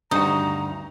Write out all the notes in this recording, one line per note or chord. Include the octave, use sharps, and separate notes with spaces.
D2 G2 D#4 F#4 A#5